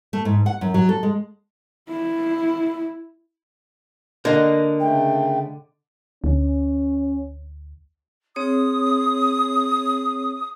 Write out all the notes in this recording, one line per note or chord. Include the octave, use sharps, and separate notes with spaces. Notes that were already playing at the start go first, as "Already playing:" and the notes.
A3
G#2
F#5
F#2
F#3
A4
G#3
E4
D3 A#3 D#5
C#3 A3 G5
D2 C#4
C4 G#4 C#5 D#6